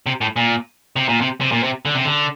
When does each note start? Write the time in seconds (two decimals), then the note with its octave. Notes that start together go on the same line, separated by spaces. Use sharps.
0.06 C3
0.21 A2
0.36 A#2
0.96 C3
1.09 A#2
1.21 C3
1.41 C3
1.52 A#2
1.63 C3
1.85 D3
1.95 C3
2.05 D3